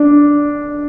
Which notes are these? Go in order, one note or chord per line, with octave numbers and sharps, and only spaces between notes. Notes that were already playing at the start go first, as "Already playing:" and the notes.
Already playing: D4